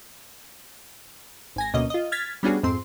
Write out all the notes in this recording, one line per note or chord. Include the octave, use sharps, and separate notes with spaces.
G#1 G#5 A#6
D2 B2 A#3 C#4 D#5
F4 D#5
F6 G#6 A6 B6
G3 B3 C#4 D4 F#4 G#4
F2 G#2 C4 C6